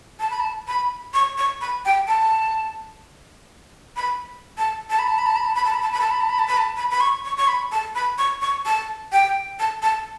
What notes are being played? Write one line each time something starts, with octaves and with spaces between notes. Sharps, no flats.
A5
B5
A5
B5
C#6
C#6
B5
G5
A5
B5
A5
A5
B5
A5
B5
A5
B5
A5
B5
A5
B5
A5
B5
A5
B5
A5
B5
A5
B5
A5
B5
B5
C#6
C#6
C#6
B5
A5
B5
C#6
C#6
A5
G5
A5
A5